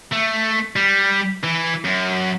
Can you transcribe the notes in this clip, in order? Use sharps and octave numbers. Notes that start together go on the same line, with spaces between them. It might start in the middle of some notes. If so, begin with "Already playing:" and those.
A3
G3
E3
F#2